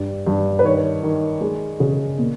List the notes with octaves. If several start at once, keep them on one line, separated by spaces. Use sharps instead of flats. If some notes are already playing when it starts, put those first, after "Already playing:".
Already playing: G2 G3
G2
B4
D#3 C#5
D#3
G#3
C#3
A#2